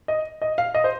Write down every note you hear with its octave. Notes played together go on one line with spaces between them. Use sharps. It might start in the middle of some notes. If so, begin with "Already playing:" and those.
D#5
D#5
F5
D#5
C5